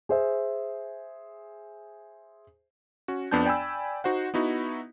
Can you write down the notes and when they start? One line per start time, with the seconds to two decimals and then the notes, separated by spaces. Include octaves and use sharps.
0.09 G#4 C5 E5
3.08 C#4 F#4
3.31 F2 B3 D4 A5 G6
3.45 D5 G5 G#5 B5 E6
4.04 D#4 F#4 C5 F#5
4.34 B3 D#4 E4 F#4